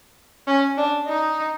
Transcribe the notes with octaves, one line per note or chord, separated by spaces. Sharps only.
C#4
D4
D#4